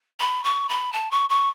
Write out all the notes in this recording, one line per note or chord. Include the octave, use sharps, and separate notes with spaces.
B5
C#6
B5
A5
C#6
C#6